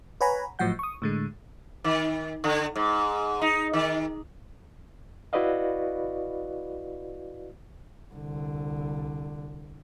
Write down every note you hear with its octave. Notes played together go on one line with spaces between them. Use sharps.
B4 C#5 F#5 G#5 A#5 B5
G#1 A2 F3 F#3 F#5 G6
C#6 D#6
A2 D3 G#3
D#3
D3
G#2
D#4
D#3
E4 F#4 B4 D5 D#5 F5
C2 D3